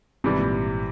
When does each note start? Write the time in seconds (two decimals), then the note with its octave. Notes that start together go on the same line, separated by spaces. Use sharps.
0.24 G#1 G#2 C3 E3 G3
0.38 A#2